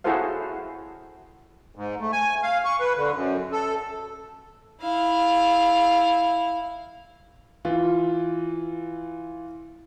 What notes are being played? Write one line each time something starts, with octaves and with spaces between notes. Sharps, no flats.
E4 F#4 G#4 A4 C5 F5
G#2
A3
G#5
F5
C#6
B4
D3
F#2
A4
E4 F5
E3 F4